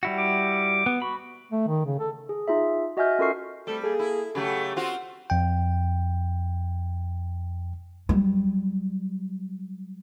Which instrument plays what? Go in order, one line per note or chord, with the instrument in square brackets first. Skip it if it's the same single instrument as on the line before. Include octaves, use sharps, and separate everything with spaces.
[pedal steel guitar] G3 E4 F#4
[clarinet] D6
[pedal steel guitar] B3
[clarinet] F#4 [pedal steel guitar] B5
[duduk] A3
D#3
C#3
A4
[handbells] G#4
D#4 F4 G#4 E5
F#4 D#5 E5 G#5 F6 G6
C#4 F4 A4 A#4 C#6 C7
[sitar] G3 [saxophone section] A3 C4 A4
[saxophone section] A#3 G#4 [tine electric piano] A4
[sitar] E4
[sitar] C#3 F#3 A3 [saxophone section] G4
[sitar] C4 F4 F#4
[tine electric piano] F2 G5
[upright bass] F#3 G3